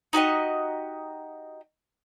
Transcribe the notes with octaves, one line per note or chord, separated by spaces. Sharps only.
D#4 F#4 G4 D#5